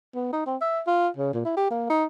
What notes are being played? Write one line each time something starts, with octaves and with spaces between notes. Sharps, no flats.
B3
D#4
C4
E5
F4
C#3
A#2
E4
G4
A#3
D#4